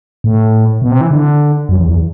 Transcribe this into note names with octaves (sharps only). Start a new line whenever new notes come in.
A2
B2
C3
E3
D3
F#2
E2
E2